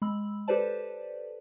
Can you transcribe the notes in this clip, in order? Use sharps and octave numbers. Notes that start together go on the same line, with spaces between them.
G#3 B5 E6
G4 A4 B4 C5 D5 A5